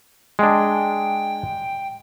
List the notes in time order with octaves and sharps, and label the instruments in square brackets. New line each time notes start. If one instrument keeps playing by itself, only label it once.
[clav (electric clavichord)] G#3 D4 [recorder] G5